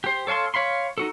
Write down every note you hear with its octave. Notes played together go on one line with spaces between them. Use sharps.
G4 C5
A4 C#5 F5 A5 C6
C#5 F5 B5 C6
D#4 F#4 A4